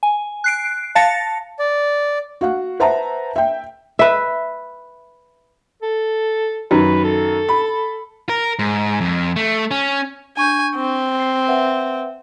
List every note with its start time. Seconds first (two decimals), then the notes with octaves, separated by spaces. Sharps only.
0.03 G#5
0.44 F#6 C7 D7
0.95 F5 A5 A6 A#6 C#7
1.59 D5
2.41 F#4 F5 F#5
2.80 B4 C5 E5 F#5 A5 A#5
3.36 E5 G5
3.99 B4 E5
5.82 A4
6.71 F#2 D#3 B4
7.04 A4
7.49 B5
8.29 A#4
8.59 G#2
9.01 F2
9.36 A3
9.71 C#4
10.37 D4 G#5 C#6 G6
10.75 C4
11.20 C7
11.48 B4 E5 F#5